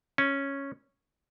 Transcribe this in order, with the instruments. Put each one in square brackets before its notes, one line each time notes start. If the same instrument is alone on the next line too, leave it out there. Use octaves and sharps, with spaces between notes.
[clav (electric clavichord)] C#4